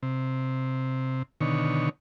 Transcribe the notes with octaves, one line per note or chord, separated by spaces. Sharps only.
C3
B2 D3 D#3 C#5